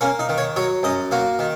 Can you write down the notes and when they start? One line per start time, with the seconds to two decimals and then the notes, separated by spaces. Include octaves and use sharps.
0.01 A#3 C#4
0.19 D#4
0.29 D#3
0.38 C#5
0.56 F#3 C#5
0.83 F#2 D#5
1.11 A#3 F#4
1.39 D#3